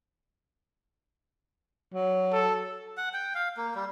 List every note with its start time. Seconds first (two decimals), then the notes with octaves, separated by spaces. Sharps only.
1.94 F#3
2.33 A4
2.97 F#5
3.14 G5
3.35 F5
3.57 A#3
3.75 G3